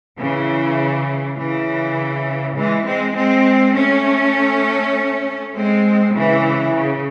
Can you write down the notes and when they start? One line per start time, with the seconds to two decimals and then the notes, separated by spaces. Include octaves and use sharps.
0.18 C#3 E3
1.38 C#3 E3
2.56 E3 G#3
2.86 G#3 C4
3.16 G#3 C4
3.75 A3 C#4
5.54 G#3 C4
6.14 C#3 E3
6.74 C#3